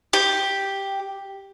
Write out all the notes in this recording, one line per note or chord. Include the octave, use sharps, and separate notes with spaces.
G4